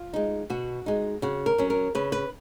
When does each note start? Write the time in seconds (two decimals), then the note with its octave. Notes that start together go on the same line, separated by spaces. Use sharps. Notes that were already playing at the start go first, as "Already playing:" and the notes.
Already playing: F4
0.13 G#3 D#4
0.50 B2 F#4
0.86 G#3 D#4
1.22 C#3 F#4
1.46 A#4
1.58 F#3 C#4
1.70 A#4
1.95 C#3 B4
2.12 B4